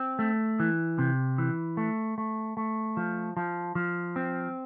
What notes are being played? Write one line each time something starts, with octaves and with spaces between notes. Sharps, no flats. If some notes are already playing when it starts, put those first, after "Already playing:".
Already playing: C4
A3
E3
C3
E3
A3
A3
A3
F3
F3
F3
C4